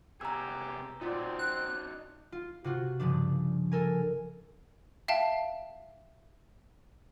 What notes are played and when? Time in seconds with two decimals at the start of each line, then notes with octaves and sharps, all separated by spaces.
0.21 C3 B3 G4 G#4 A#5 E6
1.01 A#2 C4 D#4 F#4 D5
1.39 F#6
2.32 F4
2.64 C3 F4 F#4
3.00 G2 C#3 F3 D4
3.72 A4 A#4 G#5
5.08 E5 F5 G5 A5